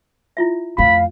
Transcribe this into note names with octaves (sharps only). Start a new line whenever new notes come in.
E4 F4 E5
F2 A3 F5 B5